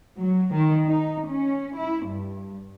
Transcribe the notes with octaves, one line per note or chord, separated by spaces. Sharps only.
F#3
D#3
D#4
C#4
E4
G2